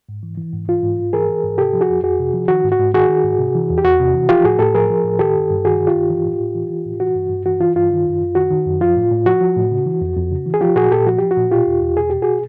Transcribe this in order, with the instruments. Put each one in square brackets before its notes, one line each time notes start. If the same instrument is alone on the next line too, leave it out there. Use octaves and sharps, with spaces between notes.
[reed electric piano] G#2
E3
E3
G#2
E3 F4
G#2
G#2
E3 G#4 A#4
E3
G#2
C3 G4 A4
F3
F#4 G#4
F2
F2 F#4 G#4
C3
F3
D#3 F#4
G#2
F#4
G#2
D#3 F#4 G#4
D#3
G#2
C3
E3
E2
G4
E2 F#4
C3
E3
F3 F4 G4
A2 F#4 G#4
A2 G4 A4
F3 G#4 A#4
F3
A2
D#3 G4 A4
G2
G2
D#3 F#4 G#4
D#3
F4 G4
G2
E3
A2
A2
E3
E3
A2
E3 F#4
G2
G2
E3 F#4
E3 F4
G2 F4
D#3
F#2
F#2
D#3 F#4
D#3
F#2
F3 F4
A2
A2
F3 F#4
F3
A2
C#3
E3
F2
F2
C#3
E3
G#4
F3 F4 G4
A#2 F#4 G#4
A#2 G4 A4
F3 F#4
F3 G4
F#4
A#2
B2 F4 G4
E2
E2
B2 G#4
B2 G4
F#4 G#4